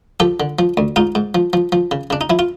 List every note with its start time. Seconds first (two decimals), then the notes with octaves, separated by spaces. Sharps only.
0.20 F3 G4 A4
0.40 D3
0.59 F3
0.77 D2
0.96 G#2 D#4 F4
1.15 G#2
1.35 F3
1.53 F3
1.72 F3
1.91 C#3
2.10 C#3 D4
2.21 D#4
2.30 F3 E4
2.39 F4